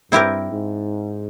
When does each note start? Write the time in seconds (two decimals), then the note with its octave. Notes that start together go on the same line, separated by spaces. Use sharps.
0.12 G2 C4 E4 G4 A#4
0.51 G#2